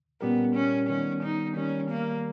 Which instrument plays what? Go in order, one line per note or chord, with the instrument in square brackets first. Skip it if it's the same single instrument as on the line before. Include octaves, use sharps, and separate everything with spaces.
[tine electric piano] A#2 G3 C#4 G4 A#4 [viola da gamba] B3
[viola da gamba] C#4
[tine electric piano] D#3 G3 B3 D#4 [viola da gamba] C#4
[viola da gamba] D#4
[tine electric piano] D#3 G3 A#3 [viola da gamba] C#4
[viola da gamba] A#3